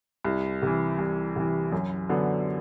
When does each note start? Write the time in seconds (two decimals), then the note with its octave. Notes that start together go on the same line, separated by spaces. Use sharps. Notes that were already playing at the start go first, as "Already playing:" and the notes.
0.25 C2
0.62 C3 E3
0.98 C2
1.36 C3 E3
1.72 F#2
2.09 D3 F#3 B3 D4